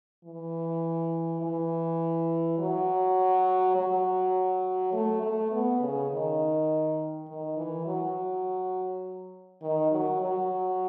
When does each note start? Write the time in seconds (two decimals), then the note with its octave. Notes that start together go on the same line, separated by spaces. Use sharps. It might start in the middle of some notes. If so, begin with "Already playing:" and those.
0.24 E3
1.41 E3
2.58 F#3
3.76 F#3
4.93 A3
5.22 A3
5.52 B3
5.80 C#3
6.11 D#3
7.27 D#3
7.57 E3
7.86 F#3
9.62 D#3
9.92 F#3
10.21 F#3